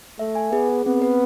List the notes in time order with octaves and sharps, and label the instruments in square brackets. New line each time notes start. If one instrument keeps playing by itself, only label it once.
[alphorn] A3 [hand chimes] E5
[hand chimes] G#5
[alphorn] B3 [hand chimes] G#4
[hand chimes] G#4
[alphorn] B3 [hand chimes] C4
[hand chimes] B4